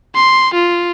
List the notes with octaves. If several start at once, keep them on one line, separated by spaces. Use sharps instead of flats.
C6
F4